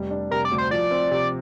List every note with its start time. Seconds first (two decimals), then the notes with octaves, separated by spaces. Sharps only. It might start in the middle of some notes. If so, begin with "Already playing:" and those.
Already playing: F1 G3
0.10 D4
0.31 C3 A#4
0.45 D5
0.51 D2
0.58 C5
0.71 F3 D5
0.91 C4
1.11 C3